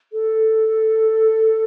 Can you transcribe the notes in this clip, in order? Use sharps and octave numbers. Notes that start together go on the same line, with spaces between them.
A4